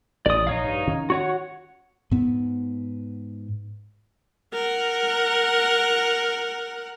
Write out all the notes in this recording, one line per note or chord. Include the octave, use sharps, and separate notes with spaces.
A1 D5 D#6
A#1 D#4 C#5 F5
G2
D#3 C#4
F#4 C#5 F#5
G#2 B3
A#4 F#5